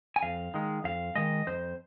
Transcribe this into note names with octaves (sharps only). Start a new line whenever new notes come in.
G#5
F2 F5
D#3 G#3
F2 F5
D#3 G#3 D#5
F2 C5